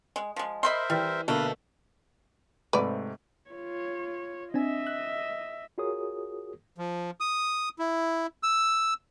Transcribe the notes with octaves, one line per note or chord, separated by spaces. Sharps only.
G#3
F3 G#3
A#4 C5 D#5 E5 B5 C6
E3 G3
B2 D3 A3 A#3 B4 F5
G#2 C3 A3 B4 D5
F4 C#5
C4 D4 D#5 E5 G#5
F#6
F4 F#4 G#4 A#4 C#5 D#6
F3
D#6
E4
E6